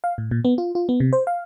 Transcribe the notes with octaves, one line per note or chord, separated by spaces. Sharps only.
F5
A2
A#2
B3
F4
F4
B3
C3
C5
F5